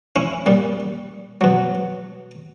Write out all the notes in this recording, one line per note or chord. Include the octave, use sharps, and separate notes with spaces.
C#4 E4
A#2 G3
B2 F#3